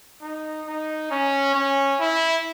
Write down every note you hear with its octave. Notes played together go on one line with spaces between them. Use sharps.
D#4
D#4
C#4
C#4
E4